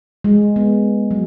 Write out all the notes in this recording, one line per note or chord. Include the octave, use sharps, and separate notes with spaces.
G#3
B3
F#3